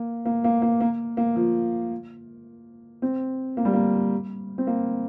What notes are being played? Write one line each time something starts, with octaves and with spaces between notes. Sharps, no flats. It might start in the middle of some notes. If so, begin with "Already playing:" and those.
Already playing: A#3
A#3
A#3
A#3
A#3
A#3
F3
C4
A#3
G3
A#3
C4
A#3